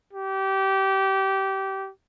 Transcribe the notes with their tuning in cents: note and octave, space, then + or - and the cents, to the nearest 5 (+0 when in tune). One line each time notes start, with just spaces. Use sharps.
G4 -20